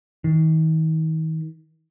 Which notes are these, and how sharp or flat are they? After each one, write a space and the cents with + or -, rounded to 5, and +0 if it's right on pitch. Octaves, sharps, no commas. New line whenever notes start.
D#3 +40